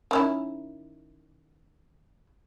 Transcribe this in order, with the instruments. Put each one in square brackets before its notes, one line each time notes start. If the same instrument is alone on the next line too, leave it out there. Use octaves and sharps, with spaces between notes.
[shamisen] D#3 C#4 E4